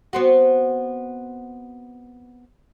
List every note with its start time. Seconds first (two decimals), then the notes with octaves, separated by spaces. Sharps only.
0.13 B3 C4 F#4